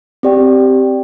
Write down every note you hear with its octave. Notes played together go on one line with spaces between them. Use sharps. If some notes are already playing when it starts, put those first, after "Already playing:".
C4 G4 D5 G5